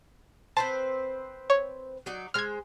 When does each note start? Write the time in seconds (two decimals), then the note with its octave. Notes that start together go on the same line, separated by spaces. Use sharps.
0.57 C4 B4 C5 A5
1.50 C#5
2.06 F#3 D#4 D5
2.34 G#3 C5 F6 G#6